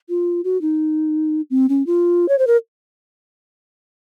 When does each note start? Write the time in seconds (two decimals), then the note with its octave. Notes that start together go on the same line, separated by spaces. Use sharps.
0.09 F4
0.44 F#4
0.62 D#4
1.50 C4
1.69 C#4
1.87 F4
2.29 C#5
2.39 C5
2.47 A#4